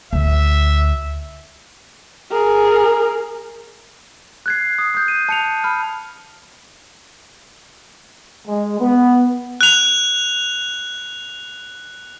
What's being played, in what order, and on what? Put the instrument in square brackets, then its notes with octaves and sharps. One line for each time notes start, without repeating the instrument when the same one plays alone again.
[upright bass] D2 [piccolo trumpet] E5
[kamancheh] G#4 A#4
[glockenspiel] F#6 G#6 C7
D#6
D#6 G6
D#7
A5 C#7 F7
B5 F6
[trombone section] G#3
B3
[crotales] F#6 F7